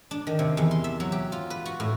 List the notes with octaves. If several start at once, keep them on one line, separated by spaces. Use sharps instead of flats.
D4
D#3
C3
E2
C6
E5
F#3
G4
F4
B4
F#4
A2